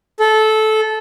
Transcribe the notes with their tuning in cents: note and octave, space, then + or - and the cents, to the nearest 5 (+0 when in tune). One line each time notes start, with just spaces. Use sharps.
A4 -20